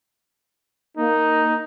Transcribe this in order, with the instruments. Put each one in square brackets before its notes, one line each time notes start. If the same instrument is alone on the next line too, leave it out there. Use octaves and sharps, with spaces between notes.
[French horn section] A#3 [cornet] D#4